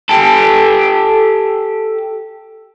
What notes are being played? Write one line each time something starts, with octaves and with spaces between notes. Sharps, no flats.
G4 A4